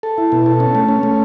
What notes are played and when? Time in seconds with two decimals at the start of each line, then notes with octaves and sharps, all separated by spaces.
0.03 A4
0.18 E4
0.32 B2
0.46 A4
0.60 C#4
0.75 A3
0.89 C#4
1.03 A3